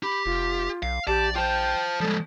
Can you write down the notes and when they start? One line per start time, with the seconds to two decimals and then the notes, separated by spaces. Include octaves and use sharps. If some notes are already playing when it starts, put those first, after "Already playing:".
0.03 G4 B5
0.26 F1 F4
0.83 B1 F5
1.07 A#1 G4 D5 A5
1.36 F4 C5 G5 A5
2.00 F3 G3 G#3 A4